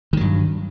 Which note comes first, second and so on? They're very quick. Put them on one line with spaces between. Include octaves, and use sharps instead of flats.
D#3 F#3 G2